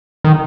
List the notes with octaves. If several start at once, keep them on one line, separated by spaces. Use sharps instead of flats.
D#3